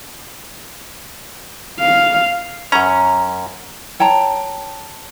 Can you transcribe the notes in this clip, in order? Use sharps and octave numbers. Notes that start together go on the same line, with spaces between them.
F5
F#2 C#4 A#5
C#5 G5 A5 A#5